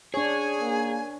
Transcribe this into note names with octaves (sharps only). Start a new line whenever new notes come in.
D4 G#4 C#5 G#5
A#3